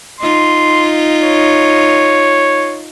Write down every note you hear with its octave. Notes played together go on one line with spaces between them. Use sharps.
D#4 F4 C6
C#5